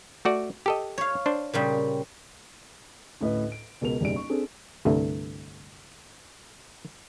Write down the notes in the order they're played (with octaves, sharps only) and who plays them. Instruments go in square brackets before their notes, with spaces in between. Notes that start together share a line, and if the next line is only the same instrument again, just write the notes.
[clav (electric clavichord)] A3 F#4 D5
G4 A4 D#5
[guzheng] C#5 F5
[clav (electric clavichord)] D4 C5
[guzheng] A#2 C#3 G3
[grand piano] D2 A2 C#4 B4 D#5
D7
C#2 B2 A#4 F7
F#1 B1 G3 D5 D7
C#6
C4 D4 G#4 A4
[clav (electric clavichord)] C2 G2 D3 A3